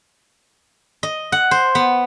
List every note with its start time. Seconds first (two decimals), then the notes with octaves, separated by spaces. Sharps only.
1.03 D#5
1.32 F#5
1.51 C5
1.75 B3